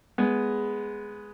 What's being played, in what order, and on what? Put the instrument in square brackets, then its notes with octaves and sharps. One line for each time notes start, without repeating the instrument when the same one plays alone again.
[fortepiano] G#3 B3